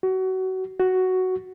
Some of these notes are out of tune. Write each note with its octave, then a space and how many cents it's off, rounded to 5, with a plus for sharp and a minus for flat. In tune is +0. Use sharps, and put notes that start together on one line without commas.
F#4 +25
F#4 +5